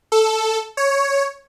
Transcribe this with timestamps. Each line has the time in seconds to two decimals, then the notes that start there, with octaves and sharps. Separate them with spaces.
0.12 A4
0.77 C#5